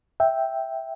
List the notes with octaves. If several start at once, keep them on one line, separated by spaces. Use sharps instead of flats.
E5 G5